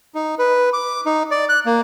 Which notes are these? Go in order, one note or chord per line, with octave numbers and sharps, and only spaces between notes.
D#4
B4
D6
D#4
D5
F#6
A#3